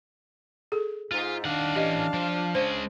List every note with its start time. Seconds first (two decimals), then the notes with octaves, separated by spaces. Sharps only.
0.72 G#4 A4
1.12 G#2 F4
1.45 D#3 D4 F5 F#5
1.76 E3 C#4 G4 D#5
2.14 F3
2.55 G#3 C#4 C5